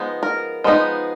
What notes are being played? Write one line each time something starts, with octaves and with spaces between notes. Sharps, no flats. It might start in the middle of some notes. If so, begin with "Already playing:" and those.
Already playing: F3 G#3 B3 D#4
A#4
F3 G#3 B3 D#4